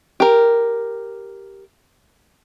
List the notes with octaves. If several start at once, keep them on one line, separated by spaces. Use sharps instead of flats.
G4 A#4